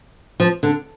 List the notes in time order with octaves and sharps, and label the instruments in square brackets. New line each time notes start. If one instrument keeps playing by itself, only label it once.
[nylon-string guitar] F3
D3